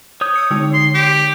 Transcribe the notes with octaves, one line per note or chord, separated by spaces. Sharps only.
C#5 D#6 G6
E6 C#7
D3 G#3 D#4
C6
G4